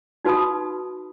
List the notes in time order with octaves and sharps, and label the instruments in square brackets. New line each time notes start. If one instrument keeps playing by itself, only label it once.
[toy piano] D#4 F#4 B4 A5 B5 D#6